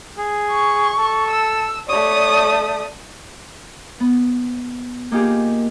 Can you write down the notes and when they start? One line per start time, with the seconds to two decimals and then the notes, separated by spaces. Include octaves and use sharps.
0.18 G#4
0.51 C#6
0.98 A4
1.30 E6
1.89 A3 C#5 D5 D#6
4.00 B3
5.11 A#3 D#4 F4 G4 G#4